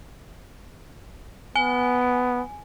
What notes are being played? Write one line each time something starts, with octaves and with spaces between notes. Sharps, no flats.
B3 G#5